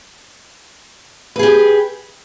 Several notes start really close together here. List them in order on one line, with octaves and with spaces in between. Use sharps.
B4 G#4 G4